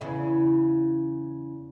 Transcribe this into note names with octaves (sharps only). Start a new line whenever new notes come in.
E2 C#3 E4